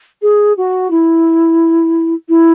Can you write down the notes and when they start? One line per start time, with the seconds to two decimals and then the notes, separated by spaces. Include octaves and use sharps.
0.22 G#4
0.57 F#4
0.91 E4
2.29 E4